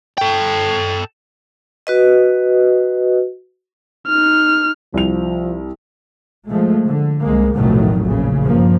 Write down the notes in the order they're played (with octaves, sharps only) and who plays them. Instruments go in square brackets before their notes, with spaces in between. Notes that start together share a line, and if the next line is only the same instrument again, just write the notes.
[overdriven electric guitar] A4 G5
[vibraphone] F#4 B4 D#5
[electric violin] D#4 F6
[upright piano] C2 F7 [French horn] F3
[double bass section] F3 G#3 A3
D3
C2 G#3 A#3
F1 B1 A2 D#3 F#3 A3
A#1 C#3
G2 F3 A#3